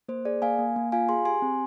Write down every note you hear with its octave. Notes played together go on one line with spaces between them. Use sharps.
A#3 C5
G#4 D5
A#3 F5 G#5
A#3
A#3
F4 F5 G#5
G#4 G#5 C6
G4 G#5 C6
C4